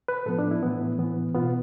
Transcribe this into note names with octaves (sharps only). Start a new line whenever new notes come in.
B4
A2 F3 B3 A4
D4
E4
A2 E3 B3
A2 E3 B3
B2 B3 F4